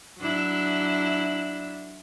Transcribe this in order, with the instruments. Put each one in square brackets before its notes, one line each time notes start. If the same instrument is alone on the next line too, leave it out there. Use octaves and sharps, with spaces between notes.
[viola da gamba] F#3 D4 E4